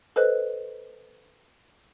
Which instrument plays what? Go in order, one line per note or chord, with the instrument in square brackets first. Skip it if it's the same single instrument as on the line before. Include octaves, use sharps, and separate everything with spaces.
[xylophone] A4 B4 C5 D#5 F#6